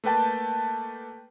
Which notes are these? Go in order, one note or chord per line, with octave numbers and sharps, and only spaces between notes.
A3 A#3 B4 G5 A5